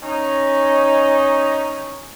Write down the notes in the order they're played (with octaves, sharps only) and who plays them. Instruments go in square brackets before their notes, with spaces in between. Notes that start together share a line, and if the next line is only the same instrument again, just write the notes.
[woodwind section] C#4 D#4